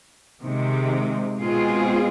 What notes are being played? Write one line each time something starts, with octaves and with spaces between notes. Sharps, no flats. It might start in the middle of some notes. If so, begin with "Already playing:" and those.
C3 D#3 G#3
B2 G#3 C4 F4 G#4